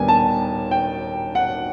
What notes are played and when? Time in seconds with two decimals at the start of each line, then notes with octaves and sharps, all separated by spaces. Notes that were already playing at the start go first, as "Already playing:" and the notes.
Already playing: D#2 D#3 G3 B3 D4 G#5
0.08 A5
0.71 G5
1.35 F#5